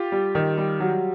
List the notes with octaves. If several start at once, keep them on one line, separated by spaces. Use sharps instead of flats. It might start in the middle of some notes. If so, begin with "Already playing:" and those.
Already playing: F4 G4
G3
D#3
G3
F#3